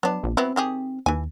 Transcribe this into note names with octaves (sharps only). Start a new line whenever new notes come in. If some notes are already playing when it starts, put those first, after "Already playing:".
F#3 B3 D4
A#1
F#3 B3 C4 E4
D#3 G4 G#4
D#2 E3 G#5